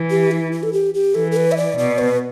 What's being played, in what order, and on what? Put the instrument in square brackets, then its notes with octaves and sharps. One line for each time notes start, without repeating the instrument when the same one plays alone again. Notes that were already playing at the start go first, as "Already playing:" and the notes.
Already playing: [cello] E3
[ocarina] G4
E4
E4
A4
G4
G4
[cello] E3 [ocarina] A4
[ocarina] A4
B4
E5
D5
[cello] B2 [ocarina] D5
[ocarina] B4